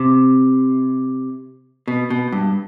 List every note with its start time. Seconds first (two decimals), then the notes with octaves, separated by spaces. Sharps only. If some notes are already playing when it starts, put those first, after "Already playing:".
Already playing: C3
1.88 B2
2.10 B2
2.32 G2